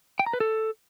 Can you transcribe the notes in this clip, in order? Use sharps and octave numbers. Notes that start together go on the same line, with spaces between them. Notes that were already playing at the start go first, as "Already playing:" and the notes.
G5
A#5
B4
A4